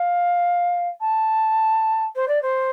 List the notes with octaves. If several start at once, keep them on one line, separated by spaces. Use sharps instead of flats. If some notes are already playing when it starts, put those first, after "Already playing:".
Already playing: F5
A5
C5
D5
C5